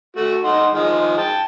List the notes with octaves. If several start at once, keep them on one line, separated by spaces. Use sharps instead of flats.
A3 F#4
D#4 F#5 C6
D#3 F3 G#3
G5 A5